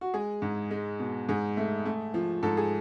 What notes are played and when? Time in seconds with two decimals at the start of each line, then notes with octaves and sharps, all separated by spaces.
0.01 F#4
0.14 G#3 G#4
0.42 G#2
0.71 G#3
1.00 B2
1.29 G#2 G#4
1.57 A3
1.85 A3
2.14 F3
2.43 G#2 A4
2.57 G#4